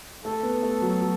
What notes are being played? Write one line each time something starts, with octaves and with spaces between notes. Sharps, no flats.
A3 A4
B3
A3
F#3
F#3